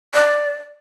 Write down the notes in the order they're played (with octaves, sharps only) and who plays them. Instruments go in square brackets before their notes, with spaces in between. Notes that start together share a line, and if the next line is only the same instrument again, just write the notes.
[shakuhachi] D5